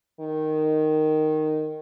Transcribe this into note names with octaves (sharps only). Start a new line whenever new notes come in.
D#3